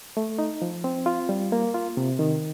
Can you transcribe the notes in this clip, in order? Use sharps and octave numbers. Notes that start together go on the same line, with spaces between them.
A3
D#4
F3
C4
F4
G3
A#3
F4
C3
D#3